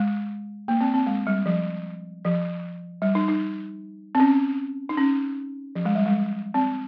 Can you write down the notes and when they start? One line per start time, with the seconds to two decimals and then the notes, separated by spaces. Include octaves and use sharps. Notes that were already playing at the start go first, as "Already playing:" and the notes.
Already playing: G#3
0.68 A#3
0.81 C4
0.94 C4
1.07 G#3
1.27 G3
1.46 F3
2.25 F3
3.02 G3
3.15 D#4
3.28 D#4
4.15 C4
4.20 C#4
4.89 D#4
4.97 C#4
5.76 F3
5.85 G#3
5.95 G3
6.06 G#3
6.54 C4